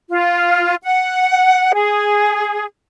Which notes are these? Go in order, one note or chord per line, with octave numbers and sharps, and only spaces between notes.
F4
F#5
G#4